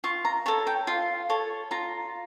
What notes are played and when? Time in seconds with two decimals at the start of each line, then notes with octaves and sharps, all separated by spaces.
0.04 F4 C#6
0.25 A#5
0.46 A4 C#5 A5
0.67 G5
0.87 F4 F5
1.30 A4 C#5
1.71 F4 A#5